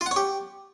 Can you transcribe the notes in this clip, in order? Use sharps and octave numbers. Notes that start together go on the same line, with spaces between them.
F4
F#5
C#5
G4